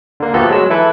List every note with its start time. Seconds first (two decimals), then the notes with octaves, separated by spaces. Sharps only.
0.20 D3 A#3
0.34 F3 A3 B3 F#4 G4 A4
0.49 F#3 G#3 E6
0.70 E3 E4 A4 B4